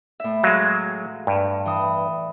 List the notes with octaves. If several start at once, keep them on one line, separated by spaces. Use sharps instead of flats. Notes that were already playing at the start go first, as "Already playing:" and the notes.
A2 E5
F#3 G#3 F5
G2
E3 D#6